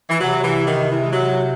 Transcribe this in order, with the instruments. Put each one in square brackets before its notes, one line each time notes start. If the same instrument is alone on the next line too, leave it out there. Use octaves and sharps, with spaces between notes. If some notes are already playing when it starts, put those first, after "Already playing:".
[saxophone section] E3
[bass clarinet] C3 [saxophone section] F#3
[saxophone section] E3
D#3
E3
G#3
F#3